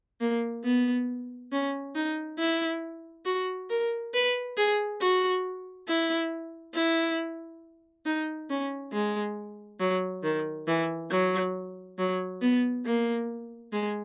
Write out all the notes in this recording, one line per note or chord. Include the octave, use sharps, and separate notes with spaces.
A#3
B3
C#4
D#4
E4
F#4
A#4
B4
G#4
F#4
E4
E4
D#4
C#4
G#3
F#3
D#3
E3
F#3
F#3
B3
A#3
G#3